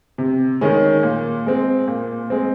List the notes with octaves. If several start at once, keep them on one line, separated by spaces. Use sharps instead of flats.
C3
D#3 G#3 C#4
A#2
G#3 C4
A#2
G#3 C4